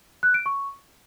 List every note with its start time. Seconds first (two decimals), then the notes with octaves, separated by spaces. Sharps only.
0.23 F#6
0.34 D7
0.46 C#6